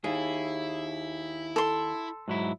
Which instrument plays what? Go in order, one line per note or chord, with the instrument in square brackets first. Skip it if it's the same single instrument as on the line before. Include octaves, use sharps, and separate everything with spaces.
[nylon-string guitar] D#2 [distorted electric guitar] E4 [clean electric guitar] G#4
[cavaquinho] A4 C6
[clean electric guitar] G#2 F#3 E4